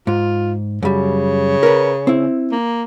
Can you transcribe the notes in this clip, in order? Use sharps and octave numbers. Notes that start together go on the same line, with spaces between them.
G#2 F4
F#2 C#3 G3
A#4 B4
C4 E4
A#3